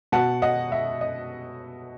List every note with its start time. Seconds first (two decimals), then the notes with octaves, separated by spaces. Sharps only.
0.12 B2 F#5 A5
0.42 D#5 F#5
0.72 E5
1.01 D#5